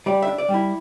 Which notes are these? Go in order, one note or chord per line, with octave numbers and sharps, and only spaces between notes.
G3 D5
D4 E5
D5
G3
E4